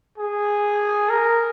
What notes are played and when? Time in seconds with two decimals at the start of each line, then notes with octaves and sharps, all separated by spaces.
0.18 G#4
1.09 A#4